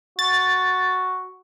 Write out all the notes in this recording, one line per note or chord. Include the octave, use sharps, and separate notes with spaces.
F#4 A6